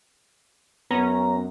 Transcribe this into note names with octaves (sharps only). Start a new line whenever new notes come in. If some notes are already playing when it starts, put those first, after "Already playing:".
F#2 B3 C#4 A#5